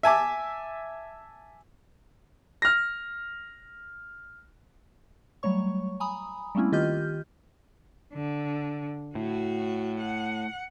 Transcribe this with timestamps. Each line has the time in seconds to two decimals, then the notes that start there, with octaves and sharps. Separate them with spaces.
0.03 E5 G#5 A5 D6
2.62 F6 A#6
5.43 F#3 G3 A3 C#5 C#6
6.00 G#5 A#5 B5 D#6
6.55 G3 A3 A#3 C4 C#4 E4
6.72 D#3 F4 G4 D#5 F6 G6
8.14 D3
9.15 A2 F#4
9.99 F#5